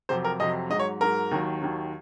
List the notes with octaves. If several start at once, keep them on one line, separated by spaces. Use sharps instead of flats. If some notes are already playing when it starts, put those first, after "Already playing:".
F2 C3 F#3 C5
A#4
F2 C3 F#3 D#5
G#2 F#3 D#5
C#5
G#2 F#3 A#4
D#2 D#3 F#3
D#2 D#3 F#3